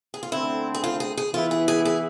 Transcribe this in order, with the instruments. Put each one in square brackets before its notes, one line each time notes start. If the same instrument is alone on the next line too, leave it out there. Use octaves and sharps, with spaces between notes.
[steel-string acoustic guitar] G#4
F4
[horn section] D3 A3 C4 [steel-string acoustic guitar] E4
[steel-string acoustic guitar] G#4
F4
G#4
G#4
[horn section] E3 B3 E4 [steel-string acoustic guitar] F4
[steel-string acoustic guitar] G#4
G#4
G#4